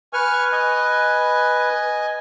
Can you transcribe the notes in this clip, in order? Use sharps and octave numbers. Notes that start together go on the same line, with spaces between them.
B4 G#5 C#6 F6
D#5 G#5